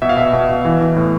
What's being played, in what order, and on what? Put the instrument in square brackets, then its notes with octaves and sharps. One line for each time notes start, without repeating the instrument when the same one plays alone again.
[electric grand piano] B2 E5
F5
B2 E5
B2
B2
E3
E3
A2